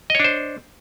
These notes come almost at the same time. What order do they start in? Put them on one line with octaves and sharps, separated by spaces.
D#5 C#5 D4 C5